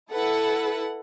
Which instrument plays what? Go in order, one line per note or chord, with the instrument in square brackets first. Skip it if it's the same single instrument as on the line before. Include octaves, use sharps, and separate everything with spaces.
[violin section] E4 B4 F#5 [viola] A4